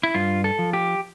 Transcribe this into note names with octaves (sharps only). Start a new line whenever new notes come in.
E4
G2 F4
A4
F3
G4